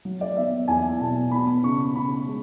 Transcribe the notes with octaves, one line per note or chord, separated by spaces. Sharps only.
F#3
D5
B3 E5
E2 G#5
B2 A5
B3 B5
C#3 C#6
C#3 B5
G#3